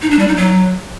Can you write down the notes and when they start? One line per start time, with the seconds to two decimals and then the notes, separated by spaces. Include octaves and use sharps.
0.02 D#4
0.10 D4
0.19 G3
0.28 D#4
0.36 F#3